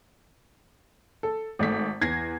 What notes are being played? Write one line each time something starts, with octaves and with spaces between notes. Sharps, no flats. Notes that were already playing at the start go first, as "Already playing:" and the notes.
A4
G#1 A3 B6
E2 G#6 A#6 C7